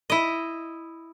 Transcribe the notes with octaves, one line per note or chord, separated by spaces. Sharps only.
E4 D#5